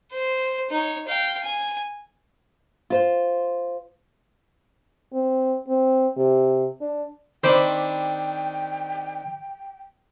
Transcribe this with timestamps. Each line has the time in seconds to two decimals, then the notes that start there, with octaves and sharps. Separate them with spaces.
0.11 C5
0.70 D#4 C#5
1.07 F5 G5
1.44 G#5
2.90 F4 C5
5.13 C4
5.68 C4
6.17 C3
6.81 D4
7.44 D#3 C4 D4 C5 G5 B5 D6